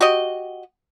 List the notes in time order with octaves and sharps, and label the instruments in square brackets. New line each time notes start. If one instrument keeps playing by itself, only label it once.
[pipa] F#4 G4 D#5